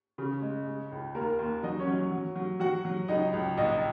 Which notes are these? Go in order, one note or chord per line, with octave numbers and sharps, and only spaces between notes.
C#3
G#3
G#3
C#2
D#2 A#3 A#4
D#2
F#3 D#4 D#5
C#4 C#5
F#3
F#3
F#3
F#3 F#4 F#5
F#3
C#2 D#4 D#5
C#2
A#1 D#4 D#5